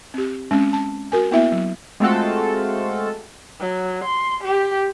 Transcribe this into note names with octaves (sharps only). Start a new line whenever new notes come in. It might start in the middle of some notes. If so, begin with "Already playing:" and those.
C4 G4
G#3 C4 C#4
A5
F#4 A#4 G#5
A#3 B3 E4 E5
F#3
G#3 A3 C4 F4 F#4 A4
F#3
C6
G4